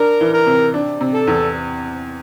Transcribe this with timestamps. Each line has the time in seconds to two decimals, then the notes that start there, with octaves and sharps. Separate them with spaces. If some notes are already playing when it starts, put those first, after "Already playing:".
Already playing: D4 A#4
0.21 E3
0.33 A#4
0.46 C3
0.74 D4
1.01 C3
1.14 A4
1.27 E2